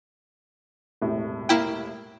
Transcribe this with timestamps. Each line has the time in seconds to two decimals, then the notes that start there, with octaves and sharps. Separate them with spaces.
1.02 E1 A2 C3
1.49 A#3 E4 G5